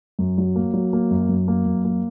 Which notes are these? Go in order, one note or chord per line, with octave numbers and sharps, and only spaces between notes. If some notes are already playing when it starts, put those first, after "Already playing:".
F#2
F#3
A#3
F#3
A#3
F#2
F#2
A#3
F#2
A#3